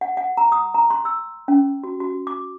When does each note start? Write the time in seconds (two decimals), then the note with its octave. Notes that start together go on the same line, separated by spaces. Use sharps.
0.01 F#5
0.17 F#5
0.37 A#5
0.52 D#6
0.74 A#5
0.90 C6
1.05 E6
1.48 C#4
1.84 F#4
2.00 F#4
2.27 D6